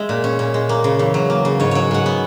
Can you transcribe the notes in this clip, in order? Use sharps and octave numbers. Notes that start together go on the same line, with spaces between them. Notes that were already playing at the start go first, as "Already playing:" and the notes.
Already playing: G#3 E5
A#2
C#4
A#2
G#3
A#3
C#3
E2
F#3
A#3
C#3
G#2 C#5
F#3 C#5
G#2 F#5
B3